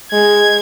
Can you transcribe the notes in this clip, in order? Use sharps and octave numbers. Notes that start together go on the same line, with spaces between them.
G#3 G#6